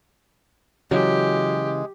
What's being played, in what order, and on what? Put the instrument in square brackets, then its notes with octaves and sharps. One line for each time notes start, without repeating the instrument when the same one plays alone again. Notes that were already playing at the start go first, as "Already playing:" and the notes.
[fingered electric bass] C#3 E3 [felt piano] F#3 [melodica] G#3 [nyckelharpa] G4